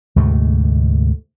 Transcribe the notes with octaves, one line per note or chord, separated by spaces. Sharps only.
D2 G#2 C3 A3